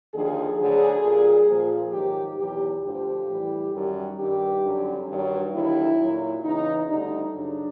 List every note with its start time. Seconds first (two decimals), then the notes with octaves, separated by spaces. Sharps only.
0.13 D#2 D3 F3 G#4
0.58 D2 D3 F#3 G#4
1.03 A#2 G3
1.48 A#2 F3
1.92 G#2 D#3 F#3 G4
2.38 E2 B2 F#3 G4
2.83 D2 D3 F3 G4
3.28 A2 E3 G3
3.73 F#2 D#3 G3
4.18 G2 D#3 G3 G4
4.63 F#2 D3 G3
5.09 G2 D#3 F#3
5.54 D#2 D3 F#3 E4
5.99 A#2 F#3
6.44 E2 C#3 E3 D#4
6.88 D2 D3 G3 D#4
7.34 F#2 C#3 F#3 D4